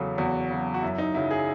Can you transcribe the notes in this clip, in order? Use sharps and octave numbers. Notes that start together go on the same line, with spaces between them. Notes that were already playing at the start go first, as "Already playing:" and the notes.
Already playing: E2 C#3 F#3 A4
E2 F#4
C#3 F#3
F#4
F#2 E4
D#4
C#3 F#3 E4
G#4